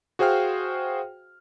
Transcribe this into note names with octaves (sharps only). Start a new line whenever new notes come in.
F#4 G#4 C5 F5 G5 F6